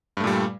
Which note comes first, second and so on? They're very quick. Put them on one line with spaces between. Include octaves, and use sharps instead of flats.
G2 A3 A#2 G3